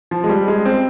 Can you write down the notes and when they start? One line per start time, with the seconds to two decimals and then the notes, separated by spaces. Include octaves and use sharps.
0.11 F3
0.24 G#3
0.29 G3
0.48 G#3
0.65 C4